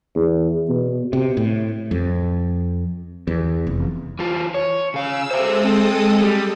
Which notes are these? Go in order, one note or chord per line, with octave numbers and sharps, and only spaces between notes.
E2
B2
C3
A2
F2
E2
F1
E3 F4
C#5
C#3 F5 E6
G#3 A4 C5 E5 D#6
C4
G3